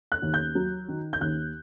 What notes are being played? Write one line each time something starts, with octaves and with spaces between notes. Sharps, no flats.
F#6
D#2
G6
F#3
D#3
G6
D#2 F#6